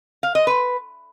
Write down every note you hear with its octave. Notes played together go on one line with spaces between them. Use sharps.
F5
D#5
B4